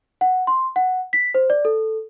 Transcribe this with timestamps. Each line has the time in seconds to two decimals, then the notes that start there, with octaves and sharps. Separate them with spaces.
0.21 F#5
0.47 C6
0.76 F#5
1.13 B6
1.35 C5
1.50 D5
1.65 A4